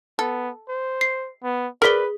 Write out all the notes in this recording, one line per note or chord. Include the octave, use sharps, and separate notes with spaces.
B3 A4
C5
C7
B3
G#4 A#4 B4 D5 B6 G7